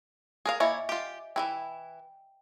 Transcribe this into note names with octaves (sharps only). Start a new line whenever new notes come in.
G#4 A#4 F5
A#3 E4 C#5 D#5 E5 G#5
F4 G4
E3 F3 E4 G5